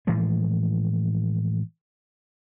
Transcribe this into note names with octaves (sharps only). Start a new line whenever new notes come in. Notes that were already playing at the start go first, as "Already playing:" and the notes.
A2 E3 F3 G#3